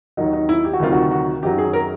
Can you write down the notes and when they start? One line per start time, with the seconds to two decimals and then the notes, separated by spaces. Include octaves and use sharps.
0.17 D#2 D#3 F#3 D#4
0.33 D#4
0.49 E4
0.64 G4
0.73 F#4
0.80 D2 C3 D#3 F#3 F4
0.93 F#4
1.11 F#4
1.43 F#2 D#3 F#3 G4
1.58 G#4
1.73 A#4